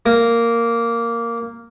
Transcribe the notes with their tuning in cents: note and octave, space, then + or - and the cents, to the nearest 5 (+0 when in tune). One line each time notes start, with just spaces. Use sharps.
A#3 -5